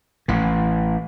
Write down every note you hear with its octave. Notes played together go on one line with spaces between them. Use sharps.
A1 E3